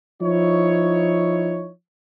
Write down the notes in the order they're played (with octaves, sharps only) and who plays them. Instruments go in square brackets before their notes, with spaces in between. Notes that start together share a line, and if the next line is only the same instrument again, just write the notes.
[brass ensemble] F3 D#4 E4 C#5